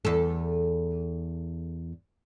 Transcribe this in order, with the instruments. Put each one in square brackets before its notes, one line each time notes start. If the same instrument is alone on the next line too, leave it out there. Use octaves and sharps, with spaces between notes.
[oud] E2 A4